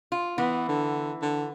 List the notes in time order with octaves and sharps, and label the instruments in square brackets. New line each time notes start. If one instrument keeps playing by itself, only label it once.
[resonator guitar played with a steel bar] F4
[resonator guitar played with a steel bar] E3 [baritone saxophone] B3
[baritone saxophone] D3
D3